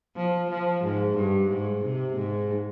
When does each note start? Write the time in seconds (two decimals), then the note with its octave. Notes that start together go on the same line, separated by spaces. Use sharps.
0.16 F3
0.51 F3
0.84 G#2
1.17 G2
1.50 G#2
1.84 C3
2.17 G#2